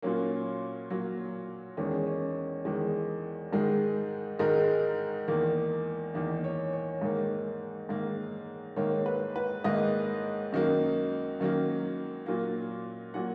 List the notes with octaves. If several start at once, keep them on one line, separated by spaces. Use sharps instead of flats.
A#2 F#3 A#3 C#4
A#2 F#3 A#3
E2 D#3 G#3 C#4
C#4
E2 D#3 G#3
G#2 D#3 G#3
G#2 D#3 G#3 A#4
E2 D#3 A#3
E2 D#3 A#3
C#5
C#5
G#2 D#3 A#3
G#2 D#3 A#3
G#2 D#3 A#3 C#5
B4
B4
G#2 D#3 A#3 D#5
F#2 D#3 F#3 A#3
F#2 D#3 F#3 A#3
A#2 F#3 A#3
A#2 F#3 A#3 F#5